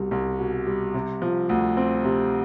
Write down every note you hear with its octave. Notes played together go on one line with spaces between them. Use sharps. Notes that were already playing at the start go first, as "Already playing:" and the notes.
Already playing: C2 B2 G3
C2
B2
G3
C3
F3
D2
C4
C3